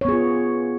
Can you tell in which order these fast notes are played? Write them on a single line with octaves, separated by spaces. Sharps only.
C#5 B3 G#4 F4